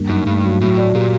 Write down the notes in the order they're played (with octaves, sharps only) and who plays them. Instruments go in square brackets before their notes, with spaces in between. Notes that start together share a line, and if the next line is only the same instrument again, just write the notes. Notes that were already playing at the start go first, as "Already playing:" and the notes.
Already playing: [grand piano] G2 A#3
[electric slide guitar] F#2 [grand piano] D#4
[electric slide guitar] G2 [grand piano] A3
[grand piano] F#3
[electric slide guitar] A2 [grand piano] F#3
[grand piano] D5
[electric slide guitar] A#2 [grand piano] G4